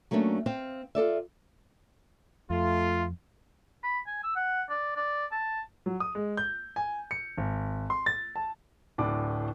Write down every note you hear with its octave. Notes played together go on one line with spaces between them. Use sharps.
F#3 A3 A#3 C#4 D4
C4 C5 F5
F4 A4 D5 E5
F2 A3 F4
B5
G#5
E6
F#5
D5
D5
A5
F#3
D#6
G#3
G6
G#5
C#7
G#1
C6
A6
A5
D1 A2 D4 D6